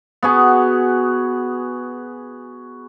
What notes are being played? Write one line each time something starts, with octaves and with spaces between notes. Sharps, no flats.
B3 F#4 G#4